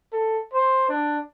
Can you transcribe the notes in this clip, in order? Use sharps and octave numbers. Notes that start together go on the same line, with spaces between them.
A4
C5
D4